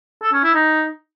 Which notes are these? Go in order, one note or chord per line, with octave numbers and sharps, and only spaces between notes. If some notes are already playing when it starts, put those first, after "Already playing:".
A4
C#4
E4
D#4